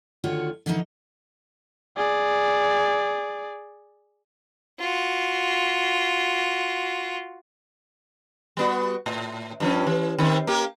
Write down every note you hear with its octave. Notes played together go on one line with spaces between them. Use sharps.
D2 D3 D#3 F4 F#4 C#5
D3 E3 F3 A#3 D4 D#4
G#4 D5
F4 F#4
G3 B3 F#4
A2
G2 F3 C#4
E3
D#3 C4 C#4
A#3 G4